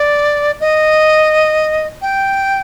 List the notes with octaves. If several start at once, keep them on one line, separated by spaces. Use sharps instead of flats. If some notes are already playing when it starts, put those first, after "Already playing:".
Already playing: D5
D#5
G5